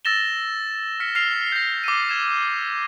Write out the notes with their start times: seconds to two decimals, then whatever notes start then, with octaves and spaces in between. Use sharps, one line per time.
0.05 E6 A6 A#6 E7 G7
1.00 F6 B6 C#7
1.15 F6 C7 F7
1.52 G6 A#6
1.84 D6 E6 D#7
2.09 G#6 E7